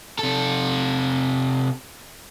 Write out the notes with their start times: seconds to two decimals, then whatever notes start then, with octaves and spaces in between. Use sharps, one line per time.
0.19 C3 A4